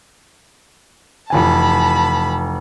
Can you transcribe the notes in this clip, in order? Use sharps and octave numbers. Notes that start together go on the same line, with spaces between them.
F1 E3 G#5 A5 B5